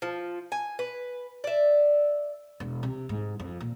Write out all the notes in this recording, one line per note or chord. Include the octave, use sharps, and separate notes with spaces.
F3
G#5
B4
D5 E5
E1
C3
G#2
F2
A#2